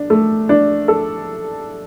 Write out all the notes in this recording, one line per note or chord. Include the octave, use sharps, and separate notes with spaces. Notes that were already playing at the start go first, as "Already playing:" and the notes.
Already playing: D4
A3
D4
A4